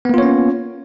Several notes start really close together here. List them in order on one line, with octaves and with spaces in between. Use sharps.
B3 A#3 F4 C#5 C#4